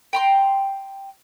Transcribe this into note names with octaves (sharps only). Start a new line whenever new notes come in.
G5 A#5 C6